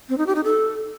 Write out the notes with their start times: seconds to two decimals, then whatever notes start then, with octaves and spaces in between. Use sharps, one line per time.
0.09 C4
0.18 D#4
0.27 G4
0.35 D#4
0.44 A4